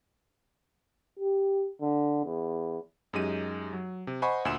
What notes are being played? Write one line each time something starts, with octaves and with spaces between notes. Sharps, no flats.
G4
D3
E2
F#2 G#3 D#4 G4 D#7
F#3
C3
C5 D#5 F#5 G#5 B5 C#6
D2 A#2 G#5 C6 E6 E7